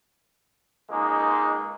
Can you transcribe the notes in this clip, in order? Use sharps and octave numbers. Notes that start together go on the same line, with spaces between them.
C#2 G#3 A#3 D#4